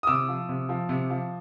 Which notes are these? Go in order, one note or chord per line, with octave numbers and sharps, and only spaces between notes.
D#6
C3 D6 E6
F3
C3
F3
C3
F3